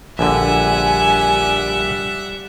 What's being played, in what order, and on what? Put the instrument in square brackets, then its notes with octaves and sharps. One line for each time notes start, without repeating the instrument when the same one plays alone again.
[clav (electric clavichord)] A#1 D3 [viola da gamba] G3 [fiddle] E5 F#5 [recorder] G#5